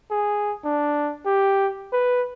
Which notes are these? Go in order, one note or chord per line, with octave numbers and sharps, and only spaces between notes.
G#4
D4
G4
B4